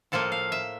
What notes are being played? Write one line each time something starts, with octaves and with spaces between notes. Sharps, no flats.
A2 F3 A#3 A4
F5
E5